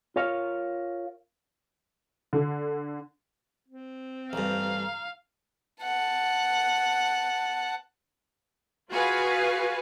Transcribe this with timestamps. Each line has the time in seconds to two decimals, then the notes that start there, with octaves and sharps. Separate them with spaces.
0.16 F4 A#4 C#5 F5
2.33 D3
3.68 C4
4.33 A1 G2 F5 A#5
5.83 F#5 A5
8.90 F4 F#4 G#4 B4 F5